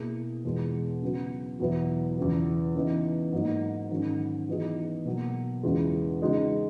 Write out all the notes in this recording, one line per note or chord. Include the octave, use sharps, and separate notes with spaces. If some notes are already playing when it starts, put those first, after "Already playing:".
Already playing: B2 A#3 E4 G#4
E2 B2 G#3
C#3 F#3 B3 F#4
E2 B2 F#3 B3 E4
E2 C#3 E3
C#3 E3 B3 D#4
G#2 F#3 A#3 D#4
G#2 D#3 F#3 C#4
E3 B3 D#4 G#4
B2 F#3 A#3
E2 C#3 E3 G#3
C#3 G#3 D#4 F#4